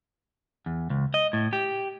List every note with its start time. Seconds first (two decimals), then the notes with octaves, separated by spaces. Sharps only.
0.66 E2
0.90 C#2
1.14 D#5
1.33 A2
1.53 G4